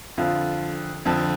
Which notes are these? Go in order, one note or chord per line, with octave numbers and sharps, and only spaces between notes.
F2 D3 F3 F4
F2 D3 F3